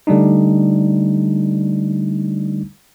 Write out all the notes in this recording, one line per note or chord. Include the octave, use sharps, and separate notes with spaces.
D3 G3 A3 D4 D#4